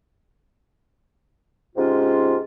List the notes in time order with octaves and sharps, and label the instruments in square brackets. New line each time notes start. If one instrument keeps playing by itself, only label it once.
[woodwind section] G#2 C3 C#4 F4